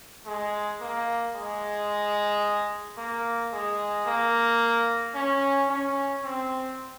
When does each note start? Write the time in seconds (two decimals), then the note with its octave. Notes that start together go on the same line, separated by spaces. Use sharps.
0.26 G#3
0.81 A#3
1.35 G#3
2.97 A#3
3.52 G#3
4.06 A#3
5.14 C#4
5.69 C#4
6.23 C4